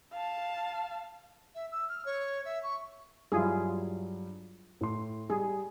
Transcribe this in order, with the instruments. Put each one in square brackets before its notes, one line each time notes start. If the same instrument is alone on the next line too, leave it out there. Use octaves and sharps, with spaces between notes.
[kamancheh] F5 A5
[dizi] E5
E6
F6
C#5
E5
C#6
[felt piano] G2 F#3 [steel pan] E4 F4 G#4
[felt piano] A2 C6
[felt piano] G3 [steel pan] G#4